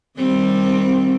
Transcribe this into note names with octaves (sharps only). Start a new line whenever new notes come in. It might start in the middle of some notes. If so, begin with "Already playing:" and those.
D#3 G3 C4